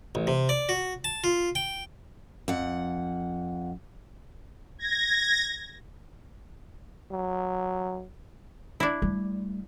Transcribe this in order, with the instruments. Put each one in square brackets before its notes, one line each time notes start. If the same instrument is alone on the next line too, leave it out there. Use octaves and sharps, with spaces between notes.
[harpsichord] A1
C3
D5
F#4
A5
F4
G5
[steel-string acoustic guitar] F2 F#5
[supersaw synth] G#6 A#6
[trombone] F#3
[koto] D4 E4
[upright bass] G3 A3